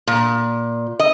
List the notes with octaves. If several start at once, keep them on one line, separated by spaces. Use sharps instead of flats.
A#2
D#5